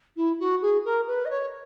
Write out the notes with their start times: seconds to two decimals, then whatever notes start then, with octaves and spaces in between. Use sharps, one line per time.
0.17 E4
0.40 F#4
0.62 G#4
0.85 A#4
1.07 B4
1.25 D#5
1.30 C#5